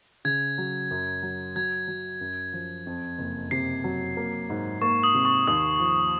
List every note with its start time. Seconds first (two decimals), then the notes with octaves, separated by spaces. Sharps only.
0.25 C#3 G#6
0.58 F#3
0.91 F#2
1.22 F#3
1.56 F#3 G#6
1.88 F#3
2.21 F#2
2.53 F3
2.86 F2
3.18 F#1
3.51 C3 C7
3.84 F#3
4.17 A#3
4.50 G#2
4.82 A#3 C#6
5.03 D#6
5.14 C3
5.25 C#6
5.47 D#2 D#6
5.79 F3